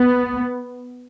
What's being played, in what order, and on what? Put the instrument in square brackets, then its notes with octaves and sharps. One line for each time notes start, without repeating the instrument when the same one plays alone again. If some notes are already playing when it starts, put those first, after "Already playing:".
Already playing: [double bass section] B3